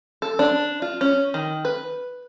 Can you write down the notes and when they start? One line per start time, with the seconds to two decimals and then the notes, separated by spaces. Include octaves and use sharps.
0.22 A4
0.39 D4
0.82 F4
1.01 C#4
1.34 D#3
1.65 B4